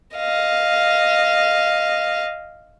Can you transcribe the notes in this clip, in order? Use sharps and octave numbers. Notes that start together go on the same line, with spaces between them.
D#5 F5